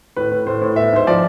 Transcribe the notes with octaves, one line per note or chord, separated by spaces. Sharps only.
A2 B4
A2
A2 C5
A2
B3 E5
G#2 C5
F3 D5